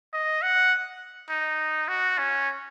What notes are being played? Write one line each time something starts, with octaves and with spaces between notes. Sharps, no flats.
D#5
F#5
D#4
F#4
C#4